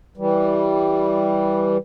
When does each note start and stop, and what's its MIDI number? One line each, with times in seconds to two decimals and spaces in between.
0.17 1.77 52
0.17 1.77 55